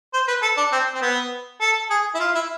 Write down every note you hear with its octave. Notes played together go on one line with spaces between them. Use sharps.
C5
B4
A4
D4
C4
C4
B3
A4
G#4
E4
F4
E4